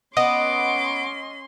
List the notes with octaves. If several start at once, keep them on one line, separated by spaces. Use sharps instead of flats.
B3 C#4 D#5 C6 D6